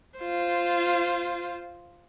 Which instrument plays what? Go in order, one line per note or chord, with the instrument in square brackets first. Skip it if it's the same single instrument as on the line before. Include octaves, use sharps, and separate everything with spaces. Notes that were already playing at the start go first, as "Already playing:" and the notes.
[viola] F4 C5